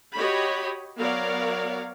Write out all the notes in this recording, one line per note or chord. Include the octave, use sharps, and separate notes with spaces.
F#4 G4 C#5 D#5 B5
F#3 B3 A#4 C#5 D5 F5